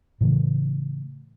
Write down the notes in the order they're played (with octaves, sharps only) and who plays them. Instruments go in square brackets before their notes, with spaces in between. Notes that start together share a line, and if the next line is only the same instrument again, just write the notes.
[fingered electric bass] A2 C#3 E3 A3